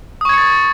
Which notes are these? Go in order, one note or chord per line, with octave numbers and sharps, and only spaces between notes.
C#6 D#6 G#6 A6 C#7